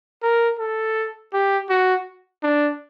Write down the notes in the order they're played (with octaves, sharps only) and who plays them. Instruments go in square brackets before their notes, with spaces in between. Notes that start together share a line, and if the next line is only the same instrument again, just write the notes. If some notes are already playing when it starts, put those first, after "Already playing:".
[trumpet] A#4
A4
G4
F#4
D4